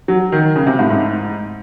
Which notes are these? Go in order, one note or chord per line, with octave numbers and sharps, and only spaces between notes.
F#3
D#3
C#3
C3
A2
G#2